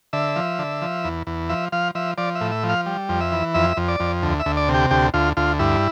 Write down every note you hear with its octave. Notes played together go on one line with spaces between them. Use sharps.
D3 E5
F3
D3
F3
E2
E2
F3 E5
F3 F5
F3 E5
F3 D5
E5
A2
E5
F3
F5
G3
F2
E5
E3
F2 E5
F2
D5
F2
D2
E5
D2
D5
C3
G4
D2 G4
D2 F4
D2 F4
G2 E4